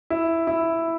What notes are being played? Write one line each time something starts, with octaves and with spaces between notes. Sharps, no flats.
E4
E4